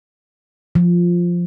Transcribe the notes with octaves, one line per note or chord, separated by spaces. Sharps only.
F3